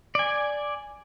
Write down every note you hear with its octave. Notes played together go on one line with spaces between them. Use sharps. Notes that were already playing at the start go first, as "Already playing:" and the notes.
D5 G#5